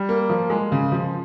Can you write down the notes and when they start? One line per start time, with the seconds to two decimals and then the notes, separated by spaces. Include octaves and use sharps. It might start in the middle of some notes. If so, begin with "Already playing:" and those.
Already playing: G3
0.09 A#3
0.29 F3
0.50 G#3
0.72 C#3
0.92 F3